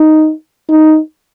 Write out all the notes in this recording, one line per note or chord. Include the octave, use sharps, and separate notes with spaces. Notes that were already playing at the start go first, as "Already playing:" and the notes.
Already playing: D#4
D#4